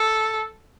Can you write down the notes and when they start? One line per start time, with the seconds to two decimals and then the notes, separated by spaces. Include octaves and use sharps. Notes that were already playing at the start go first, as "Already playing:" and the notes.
Already playing: A4